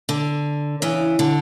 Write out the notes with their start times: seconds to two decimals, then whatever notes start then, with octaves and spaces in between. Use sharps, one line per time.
0.09 D3
0.82 C#3 E3
1.19 D3